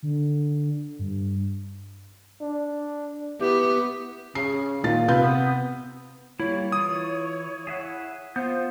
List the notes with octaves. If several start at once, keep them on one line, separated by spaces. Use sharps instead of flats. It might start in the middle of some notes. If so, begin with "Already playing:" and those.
D3
G2
D4
B3 E4 G4
C#3 C7
A#2 D#3 F4 A6
C3 F4 B4 G6
B3
G3 A#3 E4 C#5
E3 F4 D6 D#6
G#4 E5 F#5
B3 F4 C5 F5 G6